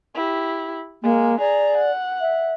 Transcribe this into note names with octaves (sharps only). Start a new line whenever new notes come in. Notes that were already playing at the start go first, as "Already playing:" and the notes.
E4 G4
G#3 A#3
G#4 D5 A#5
F#5
E5